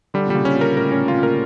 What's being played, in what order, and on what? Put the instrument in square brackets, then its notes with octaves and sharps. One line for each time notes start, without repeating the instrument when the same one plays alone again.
[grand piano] D3 [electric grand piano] G3
[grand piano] A#2
[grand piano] C#3 [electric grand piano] G3
[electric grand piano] C#4
[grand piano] A#2
[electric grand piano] A#4
[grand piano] A2 [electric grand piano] A#4
[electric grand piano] C#4
[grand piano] A#2
[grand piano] C#3 [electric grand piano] F4
[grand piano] A#2
[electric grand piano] A#4